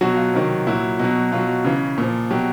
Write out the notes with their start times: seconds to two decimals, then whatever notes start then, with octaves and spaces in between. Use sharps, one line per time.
0.01 B2 F#3 F#4
0.17 F4
0.34 C3 D#3 F#3
0.67 A#2 F#3 E4
0.99 B2 F#3
1.32 B2 F#3 F4
1.64 C#3 E3
1.98 A#2 F3
2.31 B2 F#3 G4